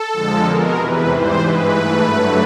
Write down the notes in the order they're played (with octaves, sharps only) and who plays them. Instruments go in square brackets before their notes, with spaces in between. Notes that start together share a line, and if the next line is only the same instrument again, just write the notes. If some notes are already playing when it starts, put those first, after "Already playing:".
Already playing: [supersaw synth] A4
F2 D3 F3 G#3
B2 G#3 A#4
E2 C3 E3 B4
G#2 E3 G3 C5
G2 E3 G#3 B4
G#2 E3 A3
G2 D3 F#3 A3